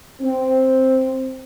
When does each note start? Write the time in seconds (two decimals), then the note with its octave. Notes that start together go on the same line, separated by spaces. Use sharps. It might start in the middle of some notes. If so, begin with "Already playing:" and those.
0.22 C4